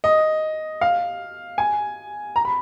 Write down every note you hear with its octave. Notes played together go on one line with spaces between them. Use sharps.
D#5
F5
G#5
A#5
B5